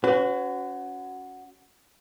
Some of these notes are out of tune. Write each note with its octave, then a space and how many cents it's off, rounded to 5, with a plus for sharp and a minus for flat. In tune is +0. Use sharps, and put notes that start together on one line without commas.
C#4 +15 F#4 +0 B4 +45